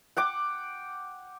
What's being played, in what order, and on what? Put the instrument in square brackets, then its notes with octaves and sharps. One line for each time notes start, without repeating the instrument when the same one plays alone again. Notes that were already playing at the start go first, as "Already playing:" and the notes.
[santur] F#5 G5 D6